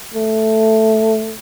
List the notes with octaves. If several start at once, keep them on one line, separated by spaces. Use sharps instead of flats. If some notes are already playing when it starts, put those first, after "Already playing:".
A3